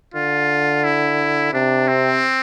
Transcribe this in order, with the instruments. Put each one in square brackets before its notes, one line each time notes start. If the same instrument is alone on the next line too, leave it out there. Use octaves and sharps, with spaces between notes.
[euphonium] D3 [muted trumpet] F4
[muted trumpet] E4
[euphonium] C3 [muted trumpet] D4
[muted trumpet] C4